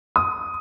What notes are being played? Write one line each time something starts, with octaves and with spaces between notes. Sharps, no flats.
D#6